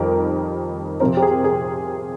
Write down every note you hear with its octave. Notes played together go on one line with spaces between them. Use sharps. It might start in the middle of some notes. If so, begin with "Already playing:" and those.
Already playing: F2 D#3 G3 A#4
C3 F3 C4 A#4
G4
G#4
G#4